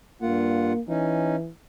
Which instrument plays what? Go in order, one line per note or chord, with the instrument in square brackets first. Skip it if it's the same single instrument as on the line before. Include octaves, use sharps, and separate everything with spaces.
[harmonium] G2 F4 F#5 [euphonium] A#3
[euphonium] E3 [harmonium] C#4 D#4